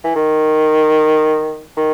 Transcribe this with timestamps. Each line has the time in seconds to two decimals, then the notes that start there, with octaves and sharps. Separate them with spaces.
0.04 E3
0.16 D#3
1.77 D#3